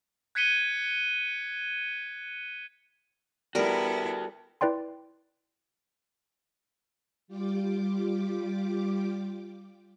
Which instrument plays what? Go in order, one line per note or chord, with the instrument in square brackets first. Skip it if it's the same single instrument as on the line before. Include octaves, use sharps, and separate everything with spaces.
[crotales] F#6 G#6 B6 C#7 D#7 G7
[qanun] G3 A#4 A#5 [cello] B3 E4 [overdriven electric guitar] F#4 A4
[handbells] E4 B4 D5 G5 C6
[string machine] G3 F4 G4 D6